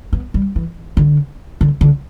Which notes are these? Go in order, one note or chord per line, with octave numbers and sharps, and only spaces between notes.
B3
G3
E3
D3
D3
D3